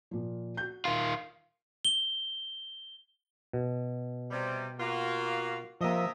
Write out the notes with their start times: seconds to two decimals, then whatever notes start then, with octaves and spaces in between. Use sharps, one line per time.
0.11 A#2 F3
0.57 F#4 G6
0.85 D#3 F4 C6
1.85 G7
3.53 B2
4.31 C3 G3
4.79 A#3 F4 F#4
5.81 C3 F3 A#3 D#5 E5